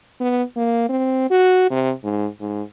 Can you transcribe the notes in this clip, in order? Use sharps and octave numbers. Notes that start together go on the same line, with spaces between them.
B3
A#3
C4
F#4
C3
G#2
G#2